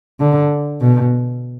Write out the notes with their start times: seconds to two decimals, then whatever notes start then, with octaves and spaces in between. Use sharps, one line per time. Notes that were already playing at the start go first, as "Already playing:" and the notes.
0.20 D3
0.80 B2